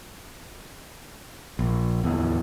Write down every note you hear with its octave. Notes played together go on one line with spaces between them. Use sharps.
A#1
D1 E2